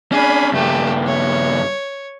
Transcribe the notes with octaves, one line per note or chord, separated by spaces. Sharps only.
C#4 D4 G#4 B5
G2 C#3 A3 G4
C#5